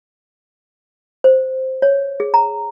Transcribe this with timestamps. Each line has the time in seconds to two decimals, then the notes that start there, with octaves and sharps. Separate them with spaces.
1.24 C5
1.82 C#5
2.20 G#4
2.34 A#5